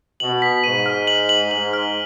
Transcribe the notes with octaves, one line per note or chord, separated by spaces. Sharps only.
B2 F#7
B6
G#2 D#7
F6
F#7
F#7
G#2 F#7
F6